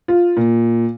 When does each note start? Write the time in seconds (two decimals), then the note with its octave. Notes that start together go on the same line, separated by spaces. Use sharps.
0.08 F4
0.37 A#2